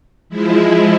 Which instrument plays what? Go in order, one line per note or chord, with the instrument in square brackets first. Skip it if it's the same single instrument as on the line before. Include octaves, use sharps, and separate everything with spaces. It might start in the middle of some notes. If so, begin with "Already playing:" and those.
[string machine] F3 G#3 E4